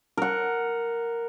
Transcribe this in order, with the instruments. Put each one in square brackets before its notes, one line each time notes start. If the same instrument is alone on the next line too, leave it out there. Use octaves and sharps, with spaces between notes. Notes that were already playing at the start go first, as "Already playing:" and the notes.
[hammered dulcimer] A#4 F#5